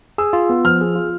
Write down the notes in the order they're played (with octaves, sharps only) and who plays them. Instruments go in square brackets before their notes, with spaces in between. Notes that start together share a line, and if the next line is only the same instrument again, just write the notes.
[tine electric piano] G#4 [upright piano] E6
[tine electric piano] F4
B3
[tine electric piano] F3 [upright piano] F6
[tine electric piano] G#4
F4